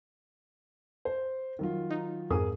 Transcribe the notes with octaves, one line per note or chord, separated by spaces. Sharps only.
C5
D#3 F#3 F4
D#4
F2 G#2 G#4 A#4 D#6